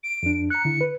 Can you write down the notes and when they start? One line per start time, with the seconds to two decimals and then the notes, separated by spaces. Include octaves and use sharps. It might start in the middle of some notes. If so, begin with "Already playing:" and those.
0.03 D7
0.23 F2 D4
0.50 A#5 F#6 C#7
0.65 D3 E4
0.81 B4